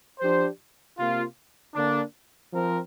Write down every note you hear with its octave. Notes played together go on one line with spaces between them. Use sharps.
F3 D4 G4 C5
C3 A#3 F4
D3 A#3 D4
F3 C4 A#4